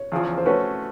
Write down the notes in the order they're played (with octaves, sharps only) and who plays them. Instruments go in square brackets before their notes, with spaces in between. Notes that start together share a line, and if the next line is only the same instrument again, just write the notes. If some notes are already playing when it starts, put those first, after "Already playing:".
Already playing: [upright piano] C#5
[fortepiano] E2 C#3 F3
[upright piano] C5
[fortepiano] A3 C#4 F#4 [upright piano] B4 C#5